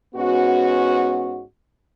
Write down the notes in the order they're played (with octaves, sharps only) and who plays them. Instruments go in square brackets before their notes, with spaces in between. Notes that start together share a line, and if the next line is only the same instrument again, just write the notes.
[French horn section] G#2 B3 C#4 F#4